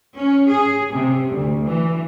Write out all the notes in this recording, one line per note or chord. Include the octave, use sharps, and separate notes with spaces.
C#4
G#4
C3
D2
E3